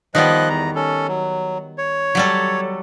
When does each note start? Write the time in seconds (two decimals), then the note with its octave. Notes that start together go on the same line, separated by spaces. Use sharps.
0.15 D#3 F3 G3 B3 D#5 F#6
0.50 E2 A#5
0.75 C#4 A4
1.08 F#3
1.78 C#5
2.15 F#3 G3 A4